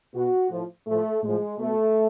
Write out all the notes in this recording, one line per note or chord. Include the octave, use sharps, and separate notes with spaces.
B2 F#4
A2 F3
A2 F3 A3
A2 F3 G#3
B2 A3